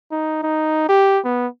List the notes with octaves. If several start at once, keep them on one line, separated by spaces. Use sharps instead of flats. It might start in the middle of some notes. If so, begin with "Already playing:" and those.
D#4
D#4
G4
B3